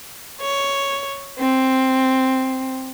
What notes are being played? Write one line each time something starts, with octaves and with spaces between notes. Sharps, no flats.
C#5
C4